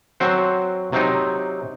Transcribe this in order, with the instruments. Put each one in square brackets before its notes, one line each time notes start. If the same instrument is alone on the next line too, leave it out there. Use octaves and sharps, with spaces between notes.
[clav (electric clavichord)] F#3 C4 F#4 C5
C3 F#3 C4 D#4